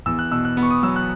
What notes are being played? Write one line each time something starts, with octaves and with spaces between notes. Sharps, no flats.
E2 E6
F#6
B2 E6
F#6
B3
C#6
D#6
F#3 E6
F#6